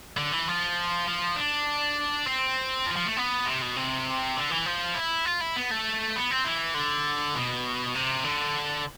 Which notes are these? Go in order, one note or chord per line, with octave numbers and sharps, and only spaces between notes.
D3
E3
F3
F3
D4
C4
F3
F3
A3
B3
C3
B2
C3
D3
E3
F3
E4
F4
E4
B3
A3
B3
C4
E3
D3
B2
C3
D3